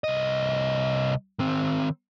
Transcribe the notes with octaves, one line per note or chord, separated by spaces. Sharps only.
C2 D#5
D#3 C4